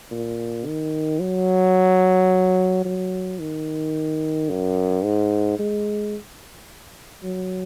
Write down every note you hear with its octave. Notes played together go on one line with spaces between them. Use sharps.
A#2
D#3
F#3
F#3
D#3
F#2
G#2
G#3
F#3